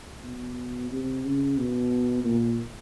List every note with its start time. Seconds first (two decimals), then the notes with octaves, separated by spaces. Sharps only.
0.24 B2
0.91 C3
1.24 C#3
1.58 B2
2.24 A#2